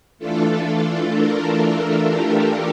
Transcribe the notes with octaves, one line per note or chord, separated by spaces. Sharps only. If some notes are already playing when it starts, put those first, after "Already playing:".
E3 A3 D4 F4 A4
A4
A#4
G4